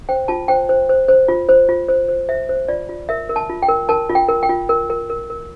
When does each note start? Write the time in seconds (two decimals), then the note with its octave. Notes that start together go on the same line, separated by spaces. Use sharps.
0.09 C5 G5
0.28 F4 A5
0.48 C5 G5
0.69 C5
0.89 C5
1.08 C5
1.28 F4
1.49 C5
1.69 F4
1.88 C5
2.08 C5
2.29 C5 E5
2.49 C5
2.68 F4 D5
2.89 F4
3.09 A#4 E5
3.29 A#4
3.36 A5
3.50 F4
3.63 G5
3.68 A#4
3.89 A#4 A5
4.10 F4
4.15 G5
4.28 A#4
4.43 G5
4.49 F4
4.69 A#4
4.90 A#4
5.10 A#4
5.30 A#4